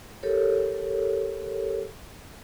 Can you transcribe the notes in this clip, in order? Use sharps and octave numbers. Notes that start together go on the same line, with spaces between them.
G4 A4 A#4 C#5